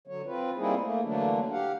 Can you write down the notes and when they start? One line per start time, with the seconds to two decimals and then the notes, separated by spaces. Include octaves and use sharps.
0.07 D3 F#3 C#5
0.26 C4 F4 B4
0.57 G3 A#3 C4 D#4 E4 G#4
0.80 A3 A#3
1.04 D3 E3 F#3 A3 A#3 D4
1.52 G4 F5 F#5